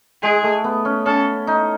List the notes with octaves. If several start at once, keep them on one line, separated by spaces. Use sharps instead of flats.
G#3 G#4
A3
B3
C#4
C#4 A4
D#4